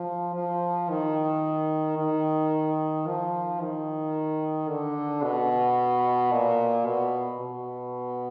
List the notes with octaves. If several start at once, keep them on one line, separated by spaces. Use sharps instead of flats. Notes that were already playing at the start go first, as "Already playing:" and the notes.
Already playing: F3
F3
D#3
D#3
F3
D#3
D3
B2
A#2
B2
B2